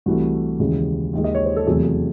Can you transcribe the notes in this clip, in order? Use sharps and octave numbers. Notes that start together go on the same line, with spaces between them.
C2 C3 E3 A3 F#4
D#2 C#3 E3 G#3
D#2 D#3 G#3
D#5
C#5
C5
A4
E2 C3 F#3 A3 G#4
G#4